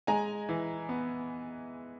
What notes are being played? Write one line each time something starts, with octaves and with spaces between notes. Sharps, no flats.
G#3 G#5 A#5
E3
B3